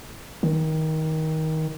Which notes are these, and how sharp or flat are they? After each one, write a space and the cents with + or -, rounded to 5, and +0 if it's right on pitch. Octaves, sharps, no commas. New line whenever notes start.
D#3 +20